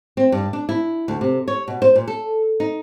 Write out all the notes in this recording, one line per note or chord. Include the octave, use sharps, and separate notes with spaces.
C4
G2
D4
E4
D2
C3
C#5
B2
C5
A#2
A4
D#4